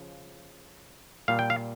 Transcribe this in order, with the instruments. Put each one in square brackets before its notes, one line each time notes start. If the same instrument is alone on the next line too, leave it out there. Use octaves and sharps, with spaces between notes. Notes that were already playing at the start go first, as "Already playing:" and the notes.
Already playing: [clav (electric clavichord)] C#3 F3
A#2 G3 F5
G5
F5